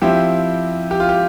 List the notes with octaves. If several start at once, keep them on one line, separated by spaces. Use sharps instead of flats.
F3 C4 E4 G4
G4
F4
G4